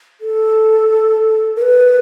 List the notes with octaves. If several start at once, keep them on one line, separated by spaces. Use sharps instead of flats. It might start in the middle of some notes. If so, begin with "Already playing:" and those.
A4
A#4
B4